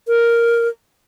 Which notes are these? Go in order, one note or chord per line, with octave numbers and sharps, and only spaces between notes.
A#4